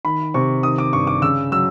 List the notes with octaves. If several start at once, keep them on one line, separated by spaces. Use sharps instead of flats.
D#3 B5
C3 C#6
D#3 D#6
D6
G2 C#6
D6
C#3 E6
F#3 E6